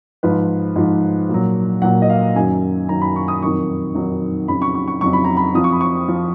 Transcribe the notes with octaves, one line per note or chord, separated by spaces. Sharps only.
G#2 F3 B4
G#2 F3
A#2 F#3
A#2 F#3 F#5
D#5
F5
F#2 D#3 F#3 G#5
F#2 D#3 F#3 A#5
B5
C#6
D#6
F2 D#3 F#3 C#6
F2 D#3 F#3
F2 C#3 F#3 B5
C#6
C#6
C#6
F2 C#3 F#3 C#6
B5
A#5
B5
F2 F3 D#6
C#6
B5
C#6
F3